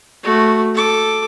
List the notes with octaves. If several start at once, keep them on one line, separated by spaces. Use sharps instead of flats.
A3 F#4
A4 D6